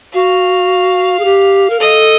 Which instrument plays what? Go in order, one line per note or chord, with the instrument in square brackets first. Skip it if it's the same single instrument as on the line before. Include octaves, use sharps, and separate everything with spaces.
[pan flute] F#4 [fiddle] F5
[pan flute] G#4
G4
A#4
[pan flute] A4 [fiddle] D#5